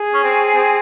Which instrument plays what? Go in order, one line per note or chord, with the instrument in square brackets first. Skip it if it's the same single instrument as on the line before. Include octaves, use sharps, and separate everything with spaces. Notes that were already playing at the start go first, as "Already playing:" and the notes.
Already playing: [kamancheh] G#4
[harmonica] C#4
C4
C4